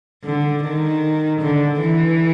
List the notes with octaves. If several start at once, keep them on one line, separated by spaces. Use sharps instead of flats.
D3
D#3
D3
E3